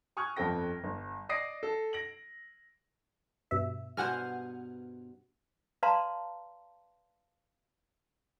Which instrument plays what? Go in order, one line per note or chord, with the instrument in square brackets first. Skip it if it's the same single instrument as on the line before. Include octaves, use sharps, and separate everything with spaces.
[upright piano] G#5 C#6 D#6 F6 F#6 G#6
G1 F2 C4 A4 G5 A#6
G1
D5 D#5 D#6 A#6 C7 D7
A4
A#6 D7 F#7
[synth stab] G2 B2 E5
[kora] G2 B2 C5 [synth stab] F#5 G#5 F6
[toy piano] B4 D5 F5 A5 A#5 C6